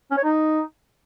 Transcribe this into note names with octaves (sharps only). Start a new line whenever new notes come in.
C#4
C#5
D#4